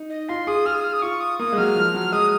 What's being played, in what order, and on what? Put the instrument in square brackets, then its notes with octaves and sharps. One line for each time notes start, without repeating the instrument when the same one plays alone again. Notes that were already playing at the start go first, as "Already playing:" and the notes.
Already playing: [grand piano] D#4
[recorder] D#5
[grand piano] F4 [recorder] C6
[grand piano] G#4 [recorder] D#6
[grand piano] G#4 [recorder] F6
[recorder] D#6
F6
D#6
[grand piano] F4 [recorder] C#6
[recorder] D#6
[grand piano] A#3 [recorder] D#6
[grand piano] G#3
[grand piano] F#3 [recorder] F6
[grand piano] F3
F#3
[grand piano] G#3 [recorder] D#6